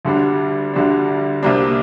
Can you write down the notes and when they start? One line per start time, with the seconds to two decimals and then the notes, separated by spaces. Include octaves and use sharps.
0.05 D2 D3 G3 D4
0.74 D2 D3 G3 D4
1.43 C2 C3 G3 A#3 D4